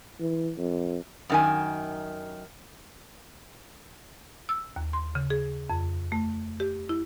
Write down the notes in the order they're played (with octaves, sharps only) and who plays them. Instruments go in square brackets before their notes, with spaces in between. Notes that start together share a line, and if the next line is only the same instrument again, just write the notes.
[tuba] E3
F2
[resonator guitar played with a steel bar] F#2 D#3 G#5
[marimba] E6
D#2
C6
C#3
G#4
F2
A3
G4
E4